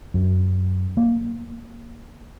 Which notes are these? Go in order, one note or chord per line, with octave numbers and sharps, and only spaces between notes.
F#2
A#3